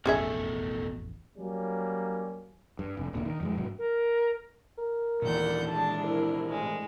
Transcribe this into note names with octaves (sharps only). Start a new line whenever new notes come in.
E1 A1 F2 B2 A3 C#4 G#4 E5
F#3 G3 A#3 C#4
G2
F1
D#1 A#2 D3
D#3
F2 F#3 G#3
F1 G#2 F#3
A#4
A#4
D#2 A#2 D#3 E3 D4 D5 F#5 G6
G#3 D4 A5
C2 E4 A#4
A2 G#3